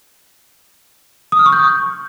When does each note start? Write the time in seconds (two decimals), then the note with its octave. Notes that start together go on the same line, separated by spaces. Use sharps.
1.32 D#6
1.39 F6
1.46 C#6
1.52 G6